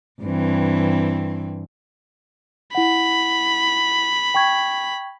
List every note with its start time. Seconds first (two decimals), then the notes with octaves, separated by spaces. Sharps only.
0.21 G2 E3 C4
2.75 E4 F#5 B5
4.34 G5 C#6 G#6